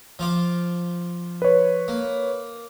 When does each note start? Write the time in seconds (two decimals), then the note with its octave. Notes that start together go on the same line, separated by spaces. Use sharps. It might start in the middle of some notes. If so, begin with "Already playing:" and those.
0.19 F3 F4 D6
1.42 B4 C#5
1.88 A#3